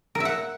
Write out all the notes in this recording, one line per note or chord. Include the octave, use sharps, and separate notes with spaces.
A#4
E5
F#5